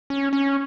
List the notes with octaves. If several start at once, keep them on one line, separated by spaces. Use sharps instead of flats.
C#4
C#4